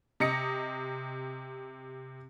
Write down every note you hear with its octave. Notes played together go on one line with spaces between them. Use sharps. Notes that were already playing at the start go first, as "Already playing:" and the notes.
C3 D#5 A#6 C#7